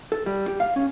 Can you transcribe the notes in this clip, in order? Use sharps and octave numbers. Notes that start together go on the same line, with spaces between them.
A4
G3
G4
F5
C#4